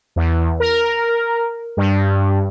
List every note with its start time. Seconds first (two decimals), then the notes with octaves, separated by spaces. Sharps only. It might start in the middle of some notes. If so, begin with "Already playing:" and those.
0.16 E2
0.60 A#4
1.77 G2